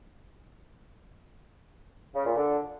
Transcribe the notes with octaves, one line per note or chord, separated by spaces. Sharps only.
C#3
A#2
D3